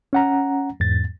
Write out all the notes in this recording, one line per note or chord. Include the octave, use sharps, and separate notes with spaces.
C#4 F#5 A#5
E2 G#2 A6